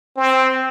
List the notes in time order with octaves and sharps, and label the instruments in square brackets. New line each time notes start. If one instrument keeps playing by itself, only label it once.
[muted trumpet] C4